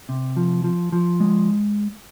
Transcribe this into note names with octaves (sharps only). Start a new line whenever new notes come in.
C3
F3
F3
F3
G#3